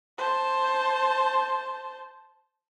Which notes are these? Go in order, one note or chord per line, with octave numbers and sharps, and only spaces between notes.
C5 A5